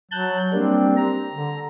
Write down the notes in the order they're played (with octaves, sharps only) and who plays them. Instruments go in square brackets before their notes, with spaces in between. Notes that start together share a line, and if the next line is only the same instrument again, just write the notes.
[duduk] F#3 [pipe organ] A5 F#6 G6
[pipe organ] G3 A#3 D4 [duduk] C4
[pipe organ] A#5
[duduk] D3